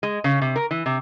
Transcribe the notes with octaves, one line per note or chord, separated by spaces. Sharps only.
G#3
C#3
C3
A#4
E3
C3